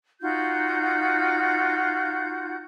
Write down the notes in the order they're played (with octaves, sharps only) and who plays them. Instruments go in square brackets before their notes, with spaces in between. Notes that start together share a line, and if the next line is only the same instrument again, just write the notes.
[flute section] D#4 F4 F#4 G6